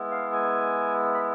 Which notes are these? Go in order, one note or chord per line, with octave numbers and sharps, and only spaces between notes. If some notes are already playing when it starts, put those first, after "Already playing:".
Already playing: G#3 B3 E4
F5
G#5
B5